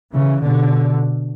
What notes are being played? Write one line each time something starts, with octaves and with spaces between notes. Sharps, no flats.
C#3 E3
B2 D3